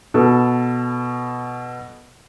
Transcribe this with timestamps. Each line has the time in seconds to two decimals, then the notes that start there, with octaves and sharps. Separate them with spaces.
0.14 B2 B3 A4